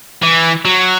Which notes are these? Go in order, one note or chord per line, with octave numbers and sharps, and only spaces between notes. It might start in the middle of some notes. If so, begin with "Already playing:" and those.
E3
F#3